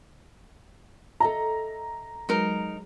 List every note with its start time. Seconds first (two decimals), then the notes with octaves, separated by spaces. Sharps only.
1.20 A4 D#5 E5 A#5
2.29 F#3 G#3 D#4 A#4